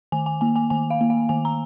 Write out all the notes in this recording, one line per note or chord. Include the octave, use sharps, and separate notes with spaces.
D#3 G#5
G#5
A#3 G#5
G#5
D#3 G#5
F5
A#3
F5
D#3 G#5
A#5